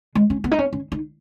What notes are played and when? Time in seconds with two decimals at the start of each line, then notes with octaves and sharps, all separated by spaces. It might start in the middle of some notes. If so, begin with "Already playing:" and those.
0.15 G#3
0.30 C#4
0.44 B3
0.51 D#4
0.59 C#4
0.73 C#4
0.92 D#4